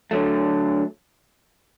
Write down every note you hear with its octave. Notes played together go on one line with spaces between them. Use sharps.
D3 F#3 A3